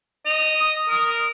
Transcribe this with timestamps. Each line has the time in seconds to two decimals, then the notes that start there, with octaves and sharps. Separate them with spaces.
0.26 D#5 F7
0.60 D#6
0.89 A#4